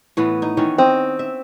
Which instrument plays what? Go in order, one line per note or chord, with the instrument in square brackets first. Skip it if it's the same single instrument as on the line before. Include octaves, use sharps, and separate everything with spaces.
[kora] A2 E3 B3
D#4
D#3 E3 C#4
[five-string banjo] C4 [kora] D#5
[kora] E5